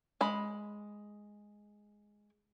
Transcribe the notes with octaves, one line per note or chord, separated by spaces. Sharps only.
G#3 B5